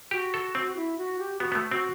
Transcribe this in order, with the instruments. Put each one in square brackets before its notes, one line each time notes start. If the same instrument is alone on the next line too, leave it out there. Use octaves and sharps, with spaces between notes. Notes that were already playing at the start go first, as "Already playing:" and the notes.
[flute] F#4 [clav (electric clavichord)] G4
[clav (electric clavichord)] A4
C4
[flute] E4
F#4
G4
[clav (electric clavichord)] B3 [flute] F#4
[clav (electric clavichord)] B3
A3
[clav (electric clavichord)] C4 [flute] F#4